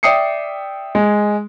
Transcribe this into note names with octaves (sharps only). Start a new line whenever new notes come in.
D5 E5 G5 D#6 C7 C#7
G#3